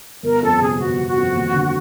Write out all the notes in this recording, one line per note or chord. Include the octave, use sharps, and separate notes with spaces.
G1 A#4
F2 A4
C3 G#4
G1 F#4
G1
F#4
F2
D#2
D3